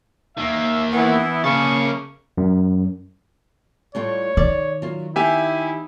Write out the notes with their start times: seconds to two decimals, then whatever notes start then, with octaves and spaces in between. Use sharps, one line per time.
0.37 D#3 A#3 E5
0.93 E3 B3 E4
1.44 C#3 A#3 A5 C#6
2.38 F#2
3.95 A2 G3 F4 C#5
4.37 D#3 D5
4.82 F#3 F4
5.16 B3 D#4 E4 G4 E5 F#5 G#5